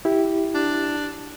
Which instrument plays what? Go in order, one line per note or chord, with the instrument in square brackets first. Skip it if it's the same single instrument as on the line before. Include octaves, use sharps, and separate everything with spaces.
[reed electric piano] E4 G4
[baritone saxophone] D4